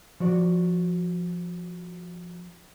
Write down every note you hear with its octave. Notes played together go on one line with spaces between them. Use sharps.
F3 F#4 D5